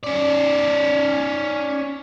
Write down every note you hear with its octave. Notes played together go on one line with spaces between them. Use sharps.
C#4 D5